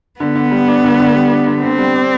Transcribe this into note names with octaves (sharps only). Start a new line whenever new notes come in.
D3 B3
D3
G3
D4
D3
D3
G3
D4
D3
D3 C4
G3
D4